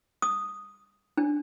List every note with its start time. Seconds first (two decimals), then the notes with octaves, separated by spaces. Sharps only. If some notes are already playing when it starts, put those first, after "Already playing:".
0.22 D#6
1.17 D4